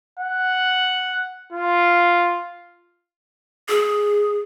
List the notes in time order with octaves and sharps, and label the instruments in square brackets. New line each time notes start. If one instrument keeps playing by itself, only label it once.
[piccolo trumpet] F#5
F4
[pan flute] G#4